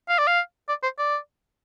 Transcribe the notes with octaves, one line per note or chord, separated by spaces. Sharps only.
F5
D5
F5
D5
C5
D5